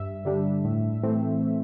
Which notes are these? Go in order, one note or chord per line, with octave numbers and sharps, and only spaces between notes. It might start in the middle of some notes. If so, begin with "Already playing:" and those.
Already playing: G2 E5
D3 G3 D4
A2
E3 A3 C4